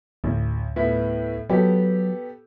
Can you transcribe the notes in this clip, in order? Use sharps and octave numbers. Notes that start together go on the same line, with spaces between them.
A1 D2
A2 B3 E4
F#3 B3 G4 A4